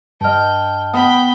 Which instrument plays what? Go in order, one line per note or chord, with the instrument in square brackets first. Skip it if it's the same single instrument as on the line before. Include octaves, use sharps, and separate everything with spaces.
[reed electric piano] G2 D#5 [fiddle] G5 [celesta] A5 F6
[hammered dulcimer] B3 [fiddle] G5 B5